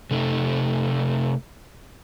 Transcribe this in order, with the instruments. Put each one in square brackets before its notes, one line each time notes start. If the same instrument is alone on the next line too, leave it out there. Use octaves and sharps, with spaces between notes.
[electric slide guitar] C3 A3 D#4